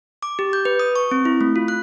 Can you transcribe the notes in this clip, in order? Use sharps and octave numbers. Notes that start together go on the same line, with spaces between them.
D6
G4
G6
B4
D#6
C#6
C4
E4
A3
F4
F#6